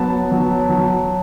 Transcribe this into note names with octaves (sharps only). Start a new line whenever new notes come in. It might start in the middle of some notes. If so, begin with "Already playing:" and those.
Already playing: F#3 B3 A5
F#3
F#3